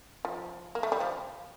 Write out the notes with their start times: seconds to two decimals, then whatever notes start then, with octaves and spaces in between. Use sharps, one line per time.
0.25 F3
0.75 A#3
0.83 A3
0.92 G3
1.00 F3